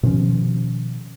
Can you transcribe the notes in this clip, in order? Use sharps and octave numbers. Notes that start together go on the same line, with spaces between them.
B2 D#3 F3 C#4